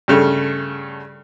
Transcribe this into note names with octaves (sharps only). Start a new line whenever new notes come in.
G2 C#3 A3